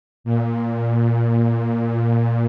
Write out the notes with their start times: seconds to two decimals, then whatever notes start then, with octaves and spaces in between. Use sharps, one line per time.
0.24 A#2
1.86 A#2